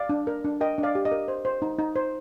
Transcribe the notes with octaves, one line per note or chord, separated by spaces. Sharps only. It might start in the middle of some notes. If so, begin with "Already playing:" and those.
Already playing: D5 F5
D4
A#4
D4
A#4 D#5 G5
D4
D5 F5
G4
D#5
A#4
C5
C5
D#4
D#4
C5